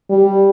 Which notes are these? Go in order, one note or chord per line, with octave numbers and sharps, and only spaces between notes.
G3